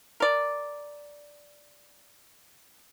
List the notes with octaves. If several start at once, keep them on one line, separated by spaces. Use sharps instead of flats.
A#4 D5